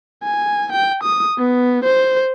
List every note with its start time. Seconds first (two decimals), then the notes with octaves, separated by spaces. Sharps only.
0.23 G#5
0.72 G5
1.03 D#6
1.38 B3
1.84 C5